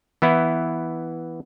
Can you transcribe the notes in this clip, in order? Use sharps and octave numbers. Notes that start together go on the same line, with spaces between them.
E3 B3 E4